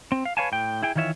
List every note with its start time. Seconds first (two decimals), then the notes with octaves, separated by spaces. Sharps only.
0.12 C4
0.25 F5
0.37 B4 C#5 F5 G#5 A5
0.52 A2 G5
0.83 E4 G#4 G5
0.95 D#3 E3 F4 C#5 E5